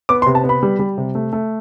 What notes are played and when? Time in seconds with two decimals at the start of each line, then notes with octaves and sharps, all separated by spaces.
0.09 B3 D6
0.22 C6
0.26 C3
0.35 A5
0.44 B3
0.49 B5
0.63 G3
0.79 G3
0.98 C3
1.15 A3
1.33 A3